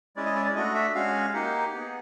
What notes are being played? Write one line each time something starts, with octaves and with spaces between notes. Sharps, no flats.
G#3 C#4 E4 D5
D#5
D5
D5
A3 D4 F#4 D#5
E5
G#3 C#4 F#4 F5
A#3 D#4 G4 F#5
B3 D#4 G#4